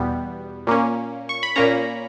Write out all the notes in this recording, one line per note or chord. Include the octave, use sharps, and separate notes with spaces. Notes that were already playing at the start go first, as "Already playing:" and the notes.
Already playing: E2 B2 G3 B3
A#2 A#3 C#4
C#6
B5
A#2 A#3 C#4 A#5